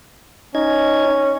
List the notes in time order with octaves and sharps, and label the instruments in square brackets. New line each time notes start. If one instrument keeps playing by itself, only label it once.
[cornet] C#4 [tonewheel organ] D#4 D#5 G#6